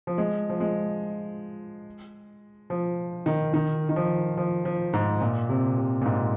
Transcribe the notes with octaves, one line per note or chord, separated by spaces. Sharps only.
F3
G#3
F3
G#3
F3
D#3
D#3
D#3
F3
F3
F3
G#2
A#2
C3
C3
A#2
G#2